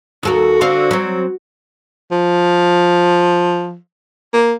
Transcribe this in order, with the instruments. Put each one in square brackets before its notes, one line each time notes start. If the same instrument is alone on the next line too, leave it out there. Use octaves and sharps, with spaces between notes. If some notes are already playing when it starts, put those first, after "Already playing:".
[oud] D#2 A4 A#4 [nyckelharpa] F#4
[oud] D3 C4 F5
F#3 C4
[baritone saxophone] F3
A#3